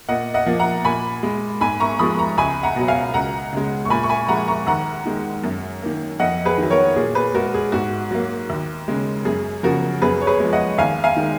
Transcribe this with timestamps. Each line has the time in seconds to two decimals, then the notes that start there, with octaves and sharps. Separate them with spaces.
0.08 A#2 D#5 F#5
0.34 D#5 F#5
0.46 F3 A#3
0.59 F#5 A#5
0.85 A#2 G#5 B5
1.23 G#3
1.61 G#2 G#5 B5
1.80 A#5 C#6
1.99 F3 G#3 B5 D#6
2.18 A#5 C#6
2.37 C#2 G#5 B5
2.63 F#5 A#5
2.76 B2 F#3
2.88 F5 G#5
3.14 C#2 F#5 A#5
3.53 C#3 G#3
3.85 C#6
3.90 A#2 G#5 B5
4.03 C#6
4.09 G#5 B5
4.28 F3 G#3 F#5 A#5
4.48 A#5 C#6
4.67 D#2 F#5 A#5
5.05 D#3 G#3
5.44 F#2
5.82 D#3 A#3
6.20 F2 D#5 F#5
6.45 G#4 B4
6.58 D#3 F#3
6.71 A#4 C#5
6.96 A#2 G#4
7.15 G#4 B4
7.34 G#3 F#4 A#4
7.54 G#4
7.72 G#2 F#4
8.11 F#3 A#3
8.50 D#2
8.88 C#3 G#3
9.25 F#2 G#4
9.63 C#3 F3 F#4 A#4
10.02 F#2 G#4 B4
10.21 C#5
10.27 G#4 B4
10.40 F3 G#3
10.53 D#5 F#5
10.78 D#2 F5 G#5
11.04 F5 G#5
11.17 D#3 G#3